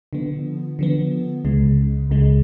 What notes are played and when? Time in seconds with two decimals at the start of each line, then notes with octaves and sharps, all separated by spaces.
0.13 D3 F3 B3
0.79 D3 F3 B3
1.45 C#2 C#3 G#3
2.10 C#2 C#3 G#3